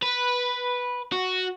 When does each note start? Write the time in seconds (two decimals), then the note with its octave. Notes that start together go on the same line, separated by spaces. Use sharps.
0.02 B4
1.12 F#4